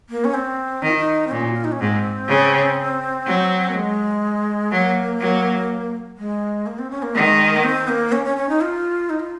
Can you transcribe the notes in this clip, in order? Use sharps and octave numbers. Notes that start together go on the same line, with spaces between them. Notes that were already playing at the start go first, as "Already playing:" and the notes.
A#3
C#4
C4
D#3 D#4
F4
D#4
C4
A#2 C#4
F#4
F4
D#4
C#4
G#2 C4
C#3
F#3
A#3
G#3
F#3 A#3
F#3
G#3
A#3
C4
C#4
A#3
D#3 G#3
A#3
C4
A#3
C#4
C#4
C#4
D#4
F4
D#4
F4